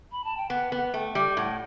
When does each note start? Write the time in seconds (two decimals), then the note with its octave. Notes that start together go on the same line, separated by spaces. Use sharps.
0.12 B5
0.24 A5
0.37 G5
0.50 B3 F#5
0.72 B3
0.93 A3 G5
1.15 G3
1.37 A2 F#5